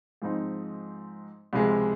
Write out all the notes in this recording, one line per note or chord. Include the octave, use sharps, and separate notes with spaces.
G#2 F3 C4 D#4
C#2 C3 F3 G#3